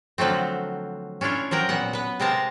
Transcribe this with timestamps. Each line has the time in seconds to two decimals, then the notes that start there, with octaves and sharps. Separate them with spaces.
0.18 D3 F3 F#3 A3 C4
1.21 C#4 D4 E4 F4 C#5
1.51 F3 F#3 A#4 G5
1.69 A#2 B3 F#5
1.93 B3 B4
2.20 C3 G#3 C4 A#4 D#5 A5